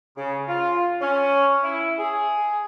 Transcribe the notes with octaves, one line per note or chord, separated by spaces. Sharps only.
C#3
F4
C#4
E4
G#4